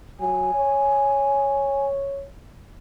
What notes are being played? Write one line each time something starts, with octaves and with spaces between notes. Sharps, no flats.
F#3 G#5
C#5